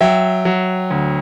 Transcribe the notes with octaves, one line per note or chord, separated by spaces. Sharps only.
F#3 E5 G5
F#3
D2